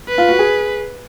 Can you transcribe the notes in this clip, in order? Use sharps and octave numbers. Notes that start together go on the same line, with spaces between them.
B4
F4
F#4
G#4